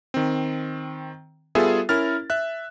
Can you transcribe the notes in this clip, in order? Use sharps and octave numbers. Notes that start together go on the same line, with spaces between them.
D#3 C4
G3 B3 F4 G#4 A4 E5
C#4 E4 A#4 F6 A6
E5 F#6